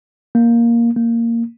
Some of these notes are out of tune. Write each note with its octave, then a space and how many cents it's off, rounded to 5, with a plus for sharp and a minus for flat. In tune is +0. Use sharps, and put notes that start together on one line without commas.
A#3 +5
A#3 -10